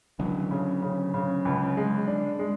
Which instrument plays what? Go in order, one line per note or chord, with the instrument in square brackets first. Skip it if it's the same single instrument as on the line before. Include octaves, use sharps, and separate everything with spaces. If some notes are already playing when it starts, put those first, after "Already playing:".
[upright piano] C#2 [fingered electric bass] D3 F#3
[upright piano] C#3
C#3
C#3
C#2
G#3
D4
G#3